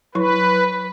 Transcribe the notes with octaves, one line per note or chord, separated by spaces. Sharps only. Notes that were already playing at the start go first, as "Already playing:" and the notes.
F#3 E4 B4 C#6